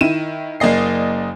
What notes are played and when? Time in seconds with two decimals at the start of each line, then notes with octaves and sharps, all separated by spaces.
0.01 D#3 E4 D#7 E7
0.60 F#1 A#3 D5 D#5 C7